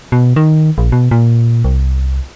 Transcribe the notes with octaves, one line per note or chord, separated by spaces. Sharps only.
B2
D#3
A#1
B2
A#2
C2